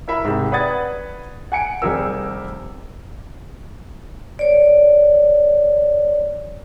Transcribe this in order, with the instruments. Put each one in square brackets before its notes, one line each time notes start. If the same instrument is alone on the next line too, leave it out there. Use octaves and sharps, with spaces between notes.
[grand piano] E4 A#4 E5 B5
G#2 C3
B4 D5 F#5 D#6 G#6 A6
F#5 G#5 C#7 D7
F1 G3 G4 G#4 A#4 E6
[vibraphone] C#5 D5